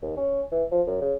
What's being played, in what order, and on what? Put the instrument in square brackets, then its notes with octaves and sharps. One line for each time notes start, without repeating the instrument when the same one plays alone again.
[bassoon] D#2
C#4
E3
F3
F#2
C#3